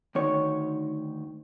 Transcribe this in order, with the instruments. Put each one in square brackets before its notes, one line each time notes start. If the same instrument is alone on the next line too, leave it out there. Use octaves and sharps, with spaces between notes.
[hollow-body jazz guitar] D2 D#3 C#5